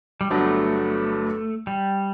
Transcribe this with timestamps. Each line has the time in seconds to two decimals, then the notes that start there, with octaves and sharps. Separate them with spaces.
0.21 G3
0.30 G1 G2 F#3 A3 B3 D4
1.67 G3